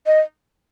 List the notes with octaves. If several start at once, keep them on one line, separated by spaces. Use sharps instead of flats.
D#5